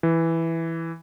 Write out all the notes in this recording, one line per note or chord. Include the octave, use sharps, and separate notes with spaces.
E3